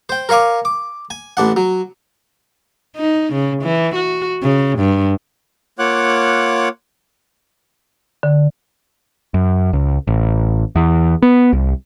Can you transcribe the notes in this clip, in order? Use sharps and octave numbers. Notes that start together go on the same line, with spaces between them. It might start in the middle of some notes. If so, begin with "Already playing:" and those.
C5 G5
A#4 C#5 F5 G#5 D6
D6
G#5
A1 D4 F#5
F#3
D#4
C#3
E3
F#4
C#3
G2
A#3 F4 C#5 F#5 D6 F#6
D3
F#2
C#2
A1
E2
B3
C2